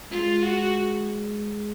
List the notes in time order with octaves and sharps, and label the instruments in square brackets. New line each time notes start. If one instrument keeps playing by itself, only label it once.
[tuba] G#3 [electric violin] F4
[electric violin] F#4